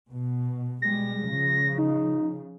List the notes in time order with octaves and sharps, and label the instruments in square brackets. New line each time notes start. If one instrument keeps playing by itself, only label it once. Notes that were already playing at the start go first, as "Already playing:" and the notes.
[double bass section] B2
[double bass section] B2 G3 G#3 [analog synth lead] A#6
[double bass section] C#3 F3
[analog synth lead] D#4